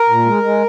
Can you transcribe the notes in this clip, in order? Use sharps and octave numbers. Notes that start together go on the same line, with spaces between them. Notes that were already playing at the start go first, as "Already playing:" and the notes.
Already playing: A#4
A#2
G#3
G#3